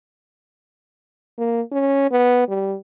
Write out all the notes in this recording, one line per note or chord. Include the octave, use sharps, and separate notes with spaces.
A#3
C#4
B3
G3